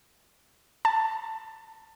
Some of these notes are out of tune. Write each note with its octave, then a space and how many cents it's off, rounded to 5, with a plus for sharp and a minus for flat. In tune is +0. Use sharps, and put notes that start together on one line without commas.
A5 +10